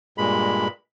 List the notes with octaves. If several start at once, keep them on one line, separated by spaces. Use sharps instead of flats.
G2 A#2 G#3 B5